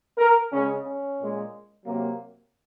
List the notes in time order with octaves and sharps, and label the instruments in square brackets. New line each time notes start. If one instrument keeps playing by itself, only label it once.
[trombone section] A#4
C#3 G#3 C#4
C#4
A#2 G#3
C3 F#3 A#3